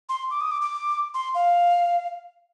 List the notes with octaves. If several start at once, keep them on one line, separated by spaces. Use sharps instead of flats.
C6
D6
D#6
D6
D6
C6
F5